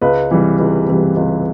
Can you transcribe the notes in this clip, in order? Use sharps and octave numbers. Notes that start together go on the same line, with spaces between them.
C#2 B4
C3 E3 G3
C#2
C3 E3 G3
C#2